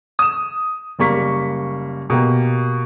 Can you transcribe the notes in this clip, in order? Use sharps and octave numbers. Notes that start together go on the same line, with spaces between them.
D#6 E7
F#1 G3 A#3 C#6 B6
B2 A#3 G4